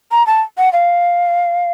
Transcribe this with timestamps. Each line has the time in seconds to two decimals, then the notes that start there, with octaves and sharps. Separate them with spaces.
0.11 A#5
0.27 A5
0.58 F#5
0.73 F5